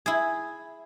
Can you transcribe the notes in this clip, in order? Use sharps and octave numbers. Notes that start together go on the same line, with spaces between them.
E4 G#4